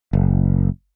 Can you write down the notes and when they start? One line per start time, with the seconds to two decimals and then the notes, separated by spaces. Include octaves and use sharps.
0.13 F#1